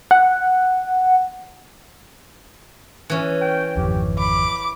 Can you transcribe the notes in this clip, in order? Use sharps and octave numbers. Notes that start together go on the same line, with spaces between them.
F#5
E3 C#4
G5
G#1 F2 G4
B5 D6